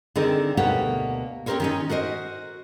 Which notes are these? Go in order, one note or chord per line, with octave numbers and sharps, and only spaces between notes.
D3 D#3 C4 D#4 G#4 A#4
D2 B2 A#3 G4 C#5 F#5
C4 C#4 G4 A#4 C5 C#5
D#3 C#4 D#4
F#4 A#4 C5 D#5